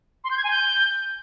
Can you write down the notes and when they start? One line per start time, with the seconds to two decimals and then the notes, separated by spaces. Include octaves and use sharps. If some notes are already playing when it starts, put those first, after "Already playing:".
0.24 C6
0.31 G6
0.37 G#6
0.44 G#5
0.51 G6